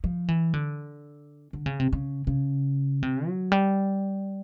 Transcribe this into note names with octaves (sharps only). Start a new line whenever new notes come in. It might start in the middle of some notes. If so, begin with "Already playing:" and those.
F3
E3
D3
D3
C#3
C3
C#3
C#3
C3
F#3
G3